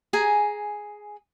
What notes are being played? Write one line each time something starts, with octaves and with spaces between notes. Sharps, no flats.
G#4 G#5 A#5